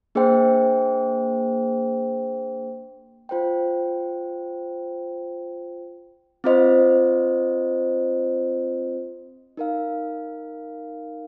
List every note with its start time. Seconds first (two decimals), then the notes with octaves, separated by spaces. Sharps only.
0.15 A#3 D4 G#4 C5 G5
3.29 F4 C5 G5
6.44 C4 F4 C5 D#5
9.57 D#4 A#4 F5